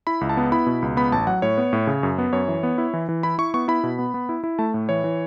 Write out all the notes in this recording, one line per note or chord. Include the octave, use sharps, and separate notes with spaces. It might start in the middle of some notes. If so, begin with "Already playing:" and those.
E4 B5
C#2
A5
B3
E4 B5
B2
C#2
B3 B5
A1 A5
F#3 F#5
A2 C#5
B3
A2
C#3
F#2
B3
F#2 C#5
E3
B3
E4
E3
E3
E4 B5
E4 C#6
B3 C#6
E4 B5
B2
B3
B3
E4
E4
A3 A5
A2
E3 C#5
E3